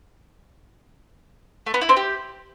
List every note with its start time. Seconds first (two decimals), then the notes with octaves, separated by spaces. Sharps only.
1.66 A3
1.74 B3
1.81 E4
1.89 C4
1.97 G4